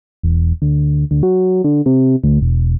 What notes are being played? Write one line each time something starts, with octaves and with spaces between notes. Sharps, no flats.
E1
D2
D2
F#3
D3
C3
D2
E1